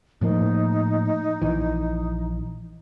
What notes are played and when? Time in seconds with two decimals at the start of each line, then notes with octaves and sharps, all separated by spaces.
0.21 A2 F3 A#3 D#4
1.42 A#1 E3